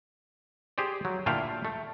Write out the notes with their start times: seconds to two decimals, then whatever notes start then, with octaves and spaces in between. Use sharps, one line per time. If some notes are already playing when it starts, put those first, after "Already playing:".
0.78 G4 G#4 C5 D5
1.05 F#3
1.26 A#2 D3 A3 E4 F5 G5
1.65 A3